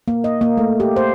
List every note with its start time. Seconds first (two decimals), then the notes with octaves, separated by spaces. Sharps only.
0.08 A#3
0.24 D#5
0.41 A#3
0.57 A3
0.80 G4
0.96 C5